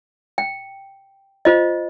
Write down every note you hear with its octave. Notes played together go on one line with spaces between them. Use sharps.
G5
F4 C5 D#5